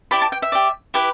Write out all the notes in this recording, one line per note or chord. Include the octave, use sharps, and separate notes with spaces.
E4 G4 D5 B5
A5
G5
E5
G4 D5
E4 G4 B4